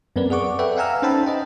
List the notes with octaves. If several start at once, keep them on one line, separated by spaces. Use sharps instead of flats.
F#2 B3 C4 A#4 B4 D5
G#4 D5 F#5 C#6 D6
A4 B4 D5 E5 F#5 G5
F5 F#5 G#5 A#5 E6 F6
C#4 D#4 C5 G5 A5 B5
C5 D#5 G5